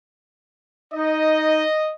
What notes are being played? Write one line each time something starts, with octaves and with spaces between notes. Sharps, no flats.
D#4 D#5